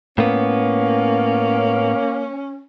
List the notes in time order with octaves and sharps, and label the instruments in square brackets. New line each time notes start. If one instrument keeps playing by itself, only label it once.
[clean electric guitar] A2 B3 [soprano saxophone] A#3 [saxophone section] C#4